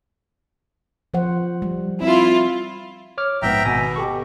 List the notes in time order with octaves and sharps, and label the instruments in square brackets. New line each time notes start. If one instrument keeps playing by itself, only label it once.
[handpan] F3 C5 F#5
G3
[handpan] C4 [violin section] E4 F4
[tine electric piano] C#5 D6 F6
[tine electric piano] A#1 G#2 B3 [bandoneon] E5 G5 A#5
[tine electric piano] G#1 G#5 A#6 [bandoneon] B2
[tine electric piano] G4 A4 C#6